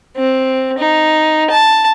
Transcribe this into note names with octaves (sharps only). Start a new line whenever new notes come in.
C4
D#4
A5